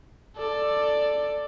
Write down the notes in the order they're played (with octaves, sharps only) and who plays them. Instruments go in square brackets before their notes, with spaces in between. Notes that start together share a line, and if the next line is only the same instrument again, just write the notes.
[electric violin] A4 D5